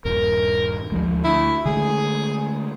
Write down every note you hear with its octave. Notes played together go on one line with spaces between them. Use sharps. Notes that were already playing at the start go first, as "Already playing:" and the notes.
D#1 G2 A#4
D2 F3 G#3
D2 E4
D3 G#3 A3 G#4